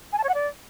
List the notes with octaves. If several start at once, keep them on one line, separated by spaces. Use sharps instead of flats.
G#5
A5
C#5
F#5
D5